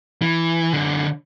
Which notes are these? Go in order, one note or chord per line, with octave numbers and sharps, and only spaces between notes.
E3
F#2 D3